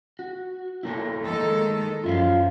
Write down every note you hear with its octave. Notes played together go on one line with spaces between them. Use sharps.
F#4
A3 A#3 E4
D#3 G#3 A4
F#2 F3 F4 E5 F5